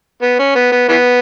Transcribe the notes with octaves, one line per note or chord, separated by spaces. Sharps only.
B3
C#4
B3
B3
E3 B3